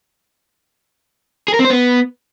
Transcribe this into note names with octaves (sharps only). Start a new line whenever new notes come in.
G#4
A#4
C4
C5
B3